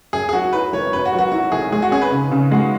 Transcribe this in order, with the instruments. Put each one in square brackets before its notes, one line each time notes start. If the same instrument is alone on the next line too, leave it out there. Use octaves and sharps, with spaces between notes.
[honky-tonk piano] F#2 [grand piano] G#4
[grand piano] G#4
[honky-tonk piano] F#3 [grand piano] F#4
[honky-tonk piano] E4 [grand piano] B4
[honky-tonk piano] G#1 [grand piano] C#5
[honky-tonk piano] F#2 [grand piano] B4
[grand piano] F#4
[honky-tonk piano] F#3
[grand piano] F#4
[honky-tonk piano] E4 [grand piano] F#4
[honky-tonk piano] G#1 [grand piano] G#4
[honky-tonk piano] G#3 [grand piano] G#4
[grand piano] F#4
[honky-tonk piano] C#4 [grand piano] G#4
[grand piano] B4
[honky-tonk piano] C#3
C#3
[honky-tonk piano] G#3 [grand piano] F#4